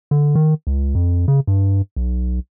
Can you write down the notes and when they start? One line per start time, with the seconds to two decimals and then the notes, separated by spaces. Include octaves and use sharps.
0.11 D3
0.35 D#3
0.67 C#2
0.95 F2
1.28 C#3
1.47 G2
1.96 B1